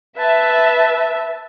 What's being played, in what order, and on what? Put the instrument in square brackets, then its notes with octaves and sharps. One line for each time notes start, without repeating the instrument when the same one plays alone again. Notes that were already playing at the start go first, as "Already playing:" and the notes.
[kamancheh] B4 A5 [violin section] E5